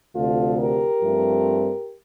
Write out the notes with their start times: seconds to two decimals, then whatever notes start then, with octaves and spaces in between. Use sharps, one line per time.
0.15 D2 C3 F3 F4 A4
0.58 G4 A#4
1.02 G2 F3 A3 C4